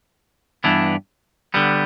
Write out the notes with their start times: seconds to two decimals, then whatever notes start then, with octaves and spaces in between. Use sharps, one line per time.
0.64 G2 E3 B3 D4
1.54 D3 G3 B3